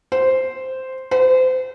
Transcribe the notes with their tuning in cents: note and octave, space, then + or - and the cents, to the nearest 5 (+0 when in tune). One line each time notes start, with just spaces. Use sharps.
C5 -5
C5 -30